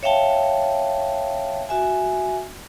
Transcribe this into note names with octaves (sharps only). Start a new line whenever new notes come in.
C#5 E5 F5 G5 A5
F#4 E5 G#5